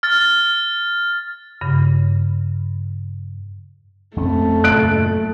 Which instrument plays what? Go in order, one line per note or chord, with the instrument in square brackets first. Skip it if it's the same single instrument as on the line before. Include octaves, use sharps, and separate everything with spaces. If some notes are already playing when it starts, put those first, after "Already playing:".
[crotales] F6 A6
[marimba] G2 C#3
[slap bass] F2 C4 C#4 [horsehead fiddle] A3
[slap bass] F#2 A#2 C#3 [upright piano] F#6 D7